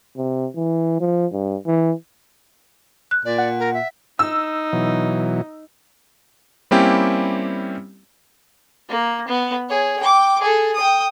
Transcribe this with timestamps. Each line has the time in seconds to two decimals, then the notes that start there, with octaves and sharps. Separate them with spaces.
0.17 C3
0.56 E3
1.01 F3
1.32 G2
1.67 E3
3.11 F#6
3.25 A#2 D5
3.38 F#5
3.59 A#4
3.74 E5
4.19 D#4 E6
4.73 B2 E3 F#3
6.71 G3 A#3 C4 C#4 E4 G4
8.89 A#3
9.28 B3
9.69 G#4 C#5
9.99 G5 D6
10.41 G#4 A4
10.75 G5 D#6